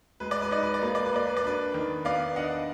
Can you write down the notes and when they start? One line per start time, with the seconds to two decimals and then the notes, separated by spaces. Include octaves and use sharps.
0.20 G#3 B4
0.31 D5
0.42 B4
0.51 D#4 D5
0.63 B4
0.74 D5
0.82 A#3 B4
0.95 D5
1.05 B4
1.13 A#3 D5
1.27 B4
1.37 D5
1.44 D4 B4
1.74 D#3
2.05 B3 D5 F5
2.36 D4 D#5 F#5